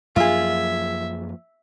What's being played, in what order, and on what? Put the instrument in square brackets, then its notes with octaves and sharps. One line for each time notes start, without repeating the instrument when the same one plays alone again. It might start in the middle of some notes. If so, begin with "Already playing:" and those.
[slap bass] F#2 F3 A#3 [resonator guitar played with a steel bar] F4 G#4 [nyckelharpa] E5